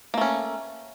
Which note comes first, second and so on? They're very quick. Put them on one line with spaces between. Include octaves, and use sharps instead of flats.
A#3 A3 C#4